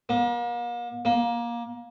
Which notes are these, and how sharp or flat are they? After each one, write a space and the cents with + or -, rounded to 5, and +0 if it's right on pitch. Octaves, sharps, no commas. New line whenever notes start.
A#3 +40
A#3 +20